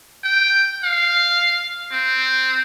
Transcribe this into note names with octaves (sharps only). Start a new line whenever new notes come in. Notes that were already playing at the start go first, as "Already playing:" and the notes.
G5
F5
C4